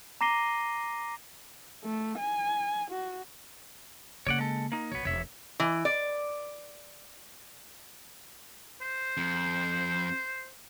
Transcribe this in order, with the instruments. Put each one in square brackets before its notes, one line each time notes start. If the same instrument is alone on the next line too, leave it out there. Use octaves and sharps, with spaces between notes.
[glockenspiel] A#5 D6 A#6 C7 D#7 G7
[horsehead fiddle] A3
G#5
F#4
[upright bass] C#3 A#3 [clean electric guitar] C#5 D5 F#5
[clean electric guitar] G#3 A4
A#3 D#4
[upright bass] B1 [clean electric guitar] B3 C#5
[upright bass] E1 [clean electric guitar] C#5 E5
[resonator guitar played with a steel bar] E3
D5
[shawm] C5
[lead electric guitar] F2